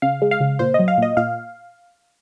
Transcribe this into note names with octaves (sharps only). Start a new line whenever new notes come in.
C#3 F5
G#3
F5
C#3
A#2 C5
F#3 D#5
F5
A#2 D#5
A#2 F5